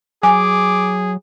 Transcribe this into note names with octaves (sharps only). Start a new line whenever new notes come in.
F#3 G#4 G#5 D6